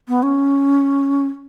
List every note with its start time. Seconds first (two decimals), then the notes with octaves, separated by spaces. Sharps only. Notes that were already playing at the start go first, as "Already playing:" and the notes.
0.08 B3
0.23 C#4